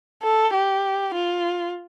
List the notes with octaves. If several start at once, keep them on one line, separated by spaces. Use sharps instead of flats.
A4
G4
F4